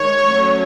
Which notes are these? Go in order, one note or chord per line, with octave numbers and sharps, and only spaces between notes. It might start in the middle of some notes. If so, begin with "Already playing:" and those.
Already playing: D#3 G#3 C#5
F#3 A3 C#4